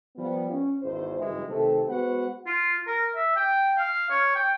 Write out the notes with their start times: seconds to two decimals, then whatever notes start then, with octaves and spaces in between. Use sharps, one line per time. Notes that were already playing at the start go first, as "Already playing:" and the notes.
0.16 F3 G3 B3
0.50 C#4
0.82 G#1 E2 C5
1.18 F#1 G2 E3 G#3 G#4 E5
1.49 C3 D#3 A3 C4 A4
1.88 G#3 B3 F#4 B4 C5 F#5
2.46 F4
2.87 A#4
3.15 E5
3.36 G5
3.78 F5
4.10 C#5
4.35 G5